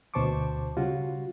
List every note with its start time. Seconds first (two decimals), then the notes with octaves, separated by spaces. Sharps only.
0.14 D2 B2 C5 A5 C#6 D6
0.77 C#3 G3 F4 F#4